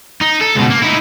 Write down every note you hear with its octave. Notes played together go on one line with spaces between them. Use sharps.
D#4
A4
C#2 B2
A#3
D#4 E4